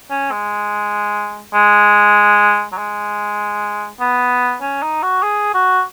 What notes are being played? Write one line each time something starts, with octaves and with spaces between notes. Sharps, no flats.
C#4
G#3
G#3
F#3
G#3
B3
C#4
D#4
F#4
G#4
F#4